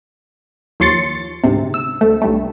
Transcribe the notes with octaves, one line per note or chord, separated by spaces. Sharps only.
D#2 F3 C#5 C6 A6 C#7
D2 G#2 C3
E6
D2 A3
B1 G2 A3